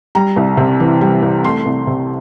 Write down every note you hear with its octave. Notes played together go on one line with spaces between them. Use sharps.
G3 A#5
C2
C3
E3
G3
C2
A3 C6
C2
C3